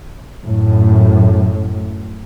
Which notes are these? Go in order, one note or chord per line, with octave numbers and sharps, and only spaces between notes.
F#2 A2